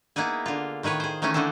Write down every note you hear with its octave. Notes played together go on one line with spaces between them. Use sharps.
A#3 B3 D#4 E4 G#4
D3 F4
A2 D#3 G#4 B4 C#5
G#4 C5
D#3 E3 A3 C#4 D#4
D3 E3 D4 A4 C5